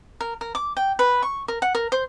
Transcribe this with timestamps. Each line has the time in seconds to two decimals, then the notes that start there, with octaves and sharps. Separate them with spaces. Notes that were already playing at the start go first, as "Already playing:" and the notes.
0.21 A#4
0.41 A#4
0.55 D6
0.77 G5
0.99 B4
1.23 C#6
1.48 A#4
1.62 F#5
1.75 A#4
1.92 C5